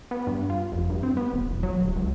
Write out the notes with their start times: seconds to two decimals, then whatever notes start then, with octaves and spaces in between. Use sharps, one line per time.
0.11 B3
0.27 G2
0.50 F4
0.72 F1
0.90 G2
1.03 C4
1.17 B3
1.32 D#1
1.51 E1
1.63 F#3
1.81 D1
1.96 C#2